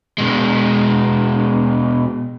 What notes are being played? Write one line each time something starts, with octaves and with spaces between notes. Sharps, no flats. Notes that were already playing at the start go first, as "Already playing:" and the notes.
B2 G#3